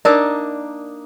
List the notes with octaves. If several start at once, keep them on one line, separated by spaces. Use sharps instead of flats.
A#3 D4 D#4 A#4 D5